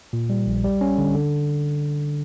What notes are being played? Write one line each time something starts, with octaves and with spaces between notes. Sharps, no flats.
A#2
G3
A#1
G3
C#4
D3
D3